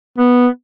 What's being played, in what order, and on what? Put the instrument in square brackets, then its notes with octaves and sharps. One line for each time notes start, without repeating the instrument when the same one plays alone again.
[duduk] B3